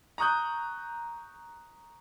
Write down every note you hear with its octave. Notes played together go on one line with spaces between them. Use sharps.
A#5 C#6 D#6 F#6 G6